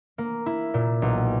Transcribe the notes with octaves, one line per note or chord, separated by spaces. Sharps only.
A#3
E4
A#2
B1